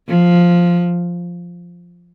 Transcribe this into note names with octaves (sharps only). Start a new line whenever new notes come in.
F3